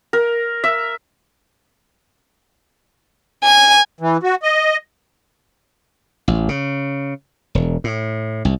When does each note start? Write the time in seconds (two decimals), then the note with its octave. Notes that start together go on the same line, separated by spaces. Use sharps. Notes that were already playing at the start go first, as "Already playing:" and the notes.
0.13 A#4
0.64 E5
3.44 G#5
4.00 E3
4.23 F#4
4.43 D#5
6.28 A1
6.49 C#3
7.55 E1
7.84 A2
8.45 C2